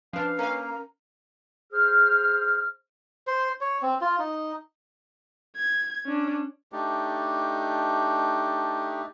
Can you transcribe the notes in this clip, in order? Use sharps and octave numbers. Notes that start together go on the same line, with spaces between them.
F3 C#4 D4 B4 F5
A#3 C#4 A#4 F5 A#5
G#4 C5 F6
C5
C#5
C4
F4
D#4
G#6
C#4 D4
A3 D4 D#4 G4